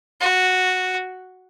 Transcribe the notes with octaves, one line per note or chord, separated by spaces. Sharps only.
F#4